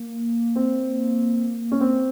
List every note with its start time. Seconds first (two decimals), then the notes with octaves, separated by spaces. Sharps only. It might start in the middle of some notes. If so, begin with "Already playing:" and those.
Already playing: A#3
0.56 C4
1.72 C#4
1.80 A#3 C4